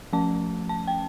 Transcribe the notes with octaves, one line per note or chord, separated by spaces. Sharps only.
F3 A3 C#4 A5
A5
G5